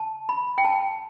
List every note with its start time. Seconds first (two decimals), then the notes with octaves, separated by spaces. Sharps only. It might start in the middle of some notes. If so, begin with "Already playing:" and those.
Already playing: A5
0.29 B5
0.58 G5
0.65 A5